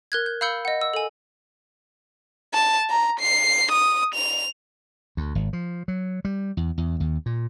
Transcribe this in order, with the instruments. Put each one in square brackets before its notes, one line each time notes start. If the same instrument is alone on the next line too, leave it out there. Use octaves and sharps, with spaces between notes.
[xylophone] A#4 F#6 G#6
G6
F5 B5 E6 G6 C#7 G7
D#5 F#5
E6
A4 G#5
[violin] A5
A#5
C7
D#6
F7
[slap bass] D2
G#1
F3
F#3
G3
E2
E2
D#2
A#2